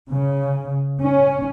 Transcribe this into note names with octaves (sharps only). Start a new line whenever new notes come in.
C#3
C#4